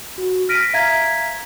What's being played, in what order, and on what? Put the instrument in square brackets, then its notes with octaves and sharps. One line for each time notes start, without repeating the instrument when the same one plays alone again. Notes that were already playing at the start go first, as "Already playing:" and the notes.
[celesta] F#4
F6 A#6 B6 D7 D#7
E5 F5 A#5 G#6 B6